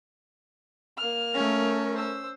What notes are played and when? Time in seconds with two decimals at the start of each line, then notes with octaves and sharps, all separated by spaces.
0.98 A#3 F6
1.34 A3 C#4 A#4
1.93 C5 E6